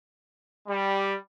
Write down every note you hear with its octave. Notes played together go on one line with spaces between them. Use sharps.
G3